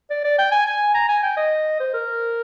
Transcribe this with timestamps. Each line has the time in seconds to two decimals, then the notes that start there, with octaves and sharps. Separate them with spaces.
0.10 D5
0.24 D5
0.39 G5
0.52 G#5
0.67 G#5
0.95 A#5
1.09 G#5
1.23 G5
1.37 D#5
1.80 C5
1.94 A#4